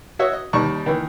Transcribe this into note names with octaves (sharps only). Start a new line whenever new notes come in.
F#4 C#5 D#5 E5
D#5
D#2 G3 D#4 D5 A5 C#6
D#3 E3 A#3